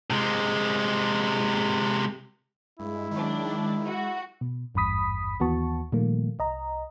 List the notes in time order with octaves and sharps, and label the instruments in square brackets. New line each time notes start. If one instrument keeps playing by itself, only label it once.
[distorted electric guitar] C3 G#3
[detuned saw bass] G2 [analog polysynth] G#3 [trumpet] E4
[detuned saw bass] D#3 [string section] F#3 D4
[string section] F#4
[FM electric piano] B2
G#1 E2 G2 B5 D#6 B6
D#2 E3 B3 F#4 A5 C#6
A#2 D#3 F3 G3 A3 A#3
C2 D#5 A#5